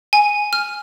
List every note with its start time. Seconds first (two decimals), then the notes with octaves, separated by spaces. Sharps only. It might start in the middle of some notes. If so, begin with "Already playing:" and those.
0.13 G#5
0.53 F6